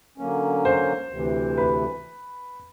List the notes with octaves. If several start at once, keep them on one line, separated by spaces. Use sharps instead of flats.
D3 F#3 A#3 C#4
C5
D2 C3 E3
B4